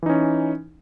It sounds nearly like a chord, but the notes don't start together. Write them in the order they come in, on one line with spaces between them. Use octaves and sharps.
E3 D#4 C#4